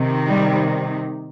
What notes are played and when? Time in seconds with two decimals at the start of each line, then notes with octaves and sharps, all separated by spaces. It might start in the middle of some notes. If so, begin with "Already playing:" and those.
Already playing: C3 D#3
0.28 G3